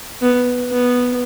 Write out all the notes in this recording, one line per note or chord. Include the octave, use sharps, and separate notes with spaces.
B3
B3